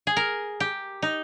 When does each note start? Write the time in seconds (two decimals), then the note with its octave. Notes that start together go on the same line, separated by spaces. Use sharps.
0.07 G#4
0.17 A#4
0.60 G4
1.02 D#4